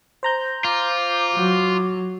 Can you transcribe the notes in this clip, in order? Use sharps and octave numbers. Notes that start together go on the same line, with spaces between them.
C5 A#5 G6
F4 D6
F#3